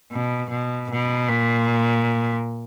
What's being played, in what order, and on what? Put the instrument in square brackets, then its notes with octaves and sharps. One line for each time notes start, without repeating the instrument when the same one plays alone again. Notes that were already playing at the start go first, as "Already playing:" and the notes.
[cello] B2
B2
B2
A#2